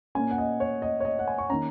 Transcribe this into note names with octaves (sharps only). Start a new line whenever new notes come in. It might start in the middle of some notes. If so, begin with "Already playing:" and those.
A#2 A#3 C#4 G#5
F#5
D#5
C#5
D#5
C#5
D#5
F#5
G#5
C#6
D#3 A#3 C#4 A#5